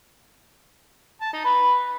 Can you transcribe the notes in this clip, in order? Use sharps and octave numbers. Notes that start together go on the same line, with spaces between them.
A5
D#4
B4